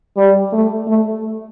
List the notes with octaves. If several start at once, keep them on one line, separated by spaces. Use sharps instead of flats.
G3
A3
A3